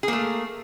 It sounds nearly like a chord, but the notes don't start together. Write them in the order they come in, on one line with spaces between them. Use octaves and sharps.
G#4 A#3 A3